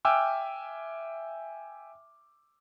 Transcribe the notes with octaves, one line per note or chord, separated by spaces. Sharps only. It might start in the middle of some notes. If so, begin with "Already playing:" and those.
E5 G5 G#5 D6 E6 F6